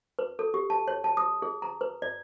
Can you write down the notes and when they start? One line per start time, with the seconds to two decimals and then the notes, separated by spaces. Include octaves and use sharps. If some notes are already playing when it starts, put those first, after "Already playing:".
0.19 B4
0.39 A4
0.54 G4
0.70 A5
0.88 C#5
1.04 A5
1.17 D#6
1.42 G#4
1.62 A#5
1.81 B4
2.02 D5